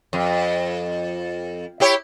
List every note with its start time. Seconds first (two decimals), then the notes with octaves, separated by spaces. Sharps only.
0.13 F2
1.80 E4 G4 C#5